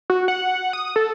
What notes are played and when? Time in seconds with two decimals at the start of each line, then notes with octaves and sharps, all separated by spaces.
0.10 F#4
0.28 F#5
0.73 D#6
0.96 A4